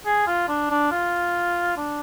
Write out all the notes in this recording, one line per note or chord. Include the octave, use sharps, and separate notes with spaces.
G#4
F4
D4
D4
F4
D4